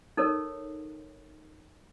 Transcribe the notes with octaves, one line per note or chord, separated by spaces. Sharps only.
D#4 A4 A#4 C#5